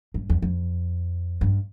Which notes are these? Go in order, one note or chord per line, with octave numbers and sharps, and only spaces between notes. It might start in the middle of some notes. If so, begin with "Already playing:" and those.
G2
E2
F2
G2